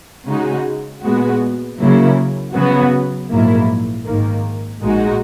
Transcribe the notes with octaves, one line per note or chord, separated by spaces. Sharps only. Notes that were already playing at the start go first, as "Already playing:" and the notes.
C#3 G#3 D#4 F#4
A#2 G#3 B3 F#4
C#3 F#3 A#3 E4
C#3 F#3 B3 F#4
A#1 G#2 F#3 A#3 E4
G#1 G#2 D#3 A#3
A#1 A#2 G#3 D#4 F#4